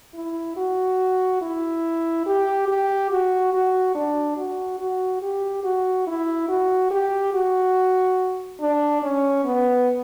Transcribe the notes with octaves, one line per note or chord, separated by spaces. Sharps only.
E4
F#4
E4
G4
G4
F#4
F#4
D4
F#4
F#4
G4
F#4
E4
F#4
G4
F#4
D4
C#4
B3